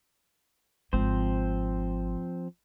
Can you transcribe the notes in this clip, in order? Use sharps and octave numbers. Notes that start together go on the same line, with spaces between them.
G#1 F3 C4 C5